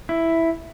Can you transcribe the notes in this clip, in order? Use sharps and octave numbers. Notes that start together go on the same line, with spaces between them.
E4